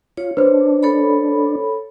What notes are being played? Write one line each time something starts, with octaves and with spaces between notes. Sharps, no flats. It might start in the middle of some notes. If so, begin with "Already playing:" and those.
F4 C#5
D4 B4 C5
A4 C#5 B5